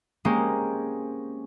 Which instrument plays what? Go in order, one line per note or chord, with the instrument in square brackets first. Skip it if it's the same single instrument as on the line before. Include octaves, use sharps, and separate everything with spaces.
[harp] G#3 A#3 C4 C#4 G4